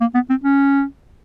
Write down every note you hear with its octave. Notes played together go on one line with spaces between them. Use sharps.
A#3
B3
C4
C#4